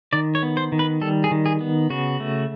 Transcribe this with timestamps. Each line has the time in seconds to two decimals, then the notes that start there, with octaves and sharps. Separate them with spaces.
0.13 D#3 D5
0.35 C#5
0.43 B3
0.57 C5
0.72 D#3
0.79 B4
1.01 G3 A4
1.24 G#4
1.31 D#3
1.46 G#4
1.61 B3
1.90 C#3 F#4
2.20 A3